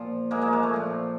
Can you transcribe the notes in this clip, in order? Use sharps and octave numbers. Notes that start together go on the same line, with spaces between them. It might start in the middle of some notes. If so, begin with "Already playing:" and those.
Already playing: A#2 F3
G#3 A#3
G#3 A#3
G#3
A3
A#2 F3